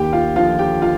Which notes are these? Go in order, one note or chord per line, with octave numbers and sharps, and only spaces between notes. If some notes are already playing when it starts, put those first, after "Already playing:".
Already playing: D#2 G4 G5
F4 F5
D3 F3 F4 F5
G4 G5
F4 F5